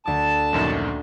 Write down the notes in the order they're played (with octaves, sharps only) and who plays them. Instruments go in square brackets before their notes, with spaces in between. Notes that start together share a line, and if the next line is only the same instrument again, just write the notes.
[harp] D2 D6 [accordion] A5
[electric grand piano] A#1 F#2 D#3